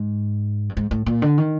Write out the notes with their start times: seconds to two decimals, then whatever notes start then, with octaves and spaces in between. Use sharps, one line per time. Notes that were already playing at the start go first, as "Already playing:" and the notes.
Already playing: G#2
0.69 G2
0.77 G#2
0.91 A2
1.06 A#2
1.22 D3
1.38 D#3